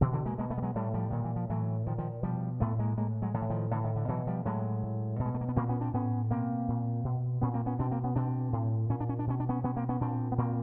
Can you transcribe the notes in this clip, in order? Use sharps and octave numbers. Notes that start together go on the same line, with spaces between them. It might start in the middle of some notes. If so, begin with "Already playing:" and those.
B2 D3 E3
D3 E3
G#3 A#3
B2 G#3 A#3
A3 B3
G3
F#3 G#3
A2 G3 A3
F3 G3
A#2 D#3
E3
F3
A2 E3 F#3
A#2 D#3 F3
D#3 F3
B2 F3 G3
A2 A3 B3
G#3 A#3
A2 G#3 A#3
F#3 G#3
A2 F3
E3
D#3 F3
A2 D3 E3
D#3
D3
B2 E3 F#3
F3 G3
A2 F#3 G#3
A2
B2
G#3
A3
A#3
B3
A#2 A#3 C4
B3 C#4
C4 D4
A2 B3 C#4
B2 A#3 C4
A#2
B2
A#2 B3 C#4
A#3 C4
B3 C#4
B2 C4 D4
A#3 C4
B3 C#4
B2 C4 D4
A2
A#2 C#4
D4
C#4
D4
B2 C#4
D4
B3 C#4
B2 B3 C#4
A#3 C4
B3 C#4
A#2 C4 D4
B3
A#2 A#3 C4